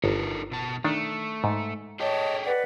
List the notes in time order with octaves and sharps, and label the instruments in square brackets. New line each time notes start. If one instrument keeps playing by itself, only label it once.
[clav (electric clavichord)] G1 [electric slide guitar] D#4 A4 A#4
[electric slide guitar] B2 A5
[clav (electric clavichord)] D#3 D4 [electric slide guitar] A3
[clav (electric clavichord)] G#2
[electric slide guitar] G#4 A4 G5 [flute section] C#5 D#5 A5
[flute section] B4 D5 F#5